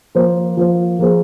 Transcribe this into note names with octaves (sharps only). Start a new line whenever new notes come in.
F3 A#3 F4 C5
F3 A#3 F4 C5
F3 A#3 G#4 C5